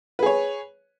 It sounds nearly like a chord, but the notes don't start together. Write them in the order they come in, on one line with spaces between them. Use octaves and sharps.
B4 G#4 C#5